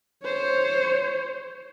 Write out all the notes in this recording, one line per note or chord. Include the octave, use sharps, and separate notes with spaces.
C5 C#5